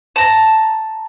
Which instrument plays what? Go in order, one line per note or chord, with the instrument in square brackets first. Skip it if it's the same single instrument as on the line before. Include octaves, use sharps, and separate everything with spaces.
[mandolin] A5 A#5